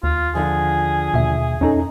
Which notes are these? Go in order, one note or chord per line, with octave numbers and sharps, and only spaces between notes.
D#2 F4
D3 F3 G#4
D#2 B2 E5
F2 C#4 D#4 A4